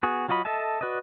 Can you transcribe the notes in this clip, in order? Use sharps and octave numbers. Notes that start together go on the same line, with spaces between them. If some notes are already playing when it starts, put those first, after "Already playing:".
B3 F#4 G#4
F#3 F4 F#4 D#5 B5
A4 D#5 E5 A5
F#4 B4 D5 D#5